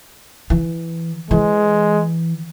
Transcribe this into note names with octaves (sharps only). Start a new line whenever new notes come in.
E3
E3 G#3